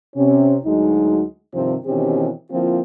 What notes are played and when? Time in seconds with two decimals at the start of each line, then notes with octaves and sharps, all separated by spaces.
0.16 C3 C#4
0.65 D2 F#3 G#3 D#4
1.53 G2 C3 D#3 F3 C4
1.86 B2 D#3 E3 C4 C#4 G4
2.51 D3 F3 A#3 C4 E4 F4